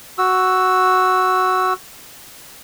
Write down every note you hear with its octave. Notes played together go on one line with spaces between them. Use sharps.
F#4 E6